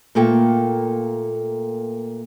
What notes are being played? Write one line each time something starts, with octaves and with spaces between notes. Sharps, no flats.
A#2 A3 A#3 A4 G5